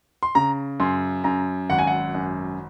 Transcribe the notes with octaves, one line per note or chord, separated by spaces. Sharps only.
C6
C#3 A#5
F#2 C6
F#2 A#5
G#1 F#5
G#5
F#5
F#2